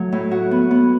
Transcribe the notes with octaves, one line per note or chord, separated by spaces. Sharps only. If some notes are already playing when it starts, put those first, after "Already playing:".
Already playing: F#3 A3
A2
F#4
B3
B3